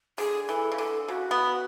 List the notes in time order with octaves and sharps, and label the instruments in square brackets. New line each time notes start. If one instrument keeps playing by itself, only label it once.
[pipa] D3 [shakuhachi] G#4
[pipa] E3 [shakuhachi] A4
[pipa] C#3
[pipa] D3 [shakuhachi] A4
[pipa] C#3 [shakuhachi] F#4
[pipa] B3